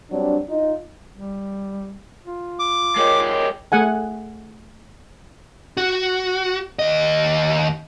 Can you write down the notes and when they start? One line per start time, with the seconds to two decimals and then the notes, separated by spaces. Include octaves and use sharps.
0.11 F#3 G3 C4 D4
0.49 D#4 F4
1.15 G3
2.24 F4
2.59 D6
2.96 G#3 G4 A#4 C#5 D#5
3.72 A3 G#4 F#5 G#5
5.77 F#4
6.79 D#2 D#5